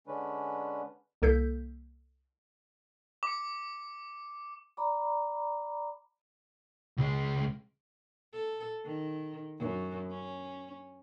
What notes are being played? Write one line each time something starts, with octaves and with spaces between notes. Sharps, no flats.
D3 G#3 C#4 D4 B4
C2 A#3 A4 G6 B6
D6 C#7
D5 A#5 B5 D6
C#2 G#3
A4
D#3
F#2
C#4